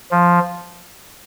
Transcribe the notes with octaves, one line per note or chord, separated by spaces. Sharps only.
F3